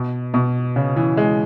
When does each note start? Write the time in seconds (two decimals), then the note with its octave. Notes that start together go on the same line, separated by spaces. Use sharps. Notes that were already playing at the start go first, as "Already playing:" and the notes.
Already playing: B2
0.34 B2
0.76 C#3
0.96 E3
1.17 G#3